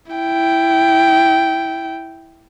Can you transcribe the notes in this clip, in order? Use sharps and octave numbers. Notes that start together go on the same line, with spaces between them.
E4 G5